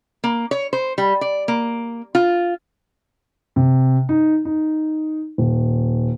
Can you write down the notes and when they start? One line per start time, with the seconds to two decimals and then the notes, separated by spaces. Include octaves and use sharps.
0.24 A#3
0.51 C#5
0.73 C5
0.98 G3
1.21 D5
1.48 A#3
2.15 F4
3.56 C3
4.09 D#4
4.45 D#4
5.38 D#1